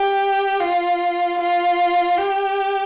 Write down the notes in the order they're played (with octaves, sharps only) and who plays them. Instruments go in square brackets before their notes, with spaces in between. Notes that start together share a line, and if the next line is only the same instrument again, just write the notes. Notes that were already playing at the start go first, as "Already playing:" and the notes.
Already playing: [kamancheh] G4
F4
F4
G4